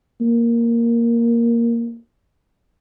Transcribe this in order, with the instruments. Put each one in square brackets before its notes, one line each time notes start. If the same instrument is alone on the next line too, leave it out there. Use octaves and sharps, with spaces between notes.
[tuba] A#3